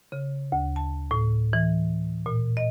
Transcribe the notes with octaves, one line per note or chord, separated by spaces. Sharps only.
C#3
D2
A5
A2
E3
A#2
D#5